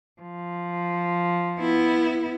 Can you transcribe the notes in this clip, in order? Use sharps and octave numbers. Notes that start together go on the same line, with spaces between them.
F3
B3 E4